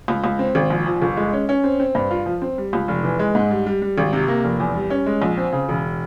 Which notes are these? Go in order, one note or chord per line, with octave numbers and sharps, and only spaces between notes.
C#2
C#2
C4
G#1
A#1
F3
G1
G#3
C#4
C#4
C4
C4
G2
F4
F3
C4
G3
C#2
F1
E3
G#3
G#2
G3
G3
G3
G#1
C3
A#3
F1
E2
G3
C#4
G#3
A#1
C4
C#3
E1